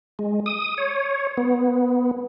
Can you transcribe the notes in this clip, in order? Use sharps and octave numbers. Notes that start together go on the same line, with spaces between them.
G#3
D#6
C#5
B3